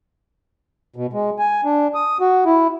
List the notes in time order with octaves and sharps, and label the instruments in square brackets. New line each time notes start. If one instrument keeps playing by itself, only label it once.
[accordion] B2
G#3
G#5
D4
D#6
F#4
E4